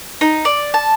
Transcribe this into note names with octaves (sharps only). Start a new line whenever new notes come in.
D#4
D5
A5